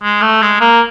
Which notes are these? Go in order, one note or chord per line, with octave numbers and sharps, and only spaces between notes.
G#3
A3
G#3
A#3